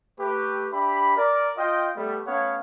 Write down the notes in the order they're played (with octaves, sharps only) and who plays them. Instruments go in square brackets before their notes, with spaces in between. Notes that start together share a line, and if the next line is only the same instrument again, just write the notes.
[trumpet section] A3 G4 B4
D4 G4 E5 B5
A#4 D5
F4 D#5 G5
G3 A3 B3
A3 B3 C#4 C#5 F5 F#5